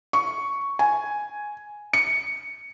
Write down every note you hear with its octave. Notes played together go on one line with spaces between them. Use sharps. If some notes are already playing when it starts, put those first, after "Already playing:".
C#6
G#5
C#7